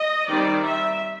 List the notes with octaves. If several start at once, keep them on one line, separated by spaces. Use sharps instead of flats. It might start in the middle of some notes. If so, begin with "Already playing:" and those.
Already playing: D#5
D#3 G3 C4 D#4 D5
E5